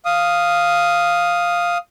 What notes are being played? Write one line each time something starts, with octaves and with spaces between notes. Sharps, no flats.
F5 D#6